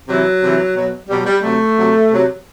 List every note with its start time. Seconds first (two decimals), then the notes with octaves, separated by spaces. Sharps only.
0.08 C3 E3 F#3
0.42 C3 E3
0.75 B2 F#3
1.08 B2 F#3 G3
1.25 G3
1.42 C3 F#3 A3
1.76 C3 F#3
2.09 C3 F#3